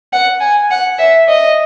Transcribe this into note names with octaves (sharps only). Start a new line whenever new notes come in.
F#5
G#5
F#5
E5
D#5